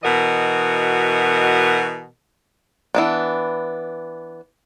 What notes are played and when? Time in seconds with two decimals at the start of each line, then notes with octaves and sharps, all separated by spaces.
0.02 B2 E3 F#4 A#4 D#5
2.95 E3 B3 D4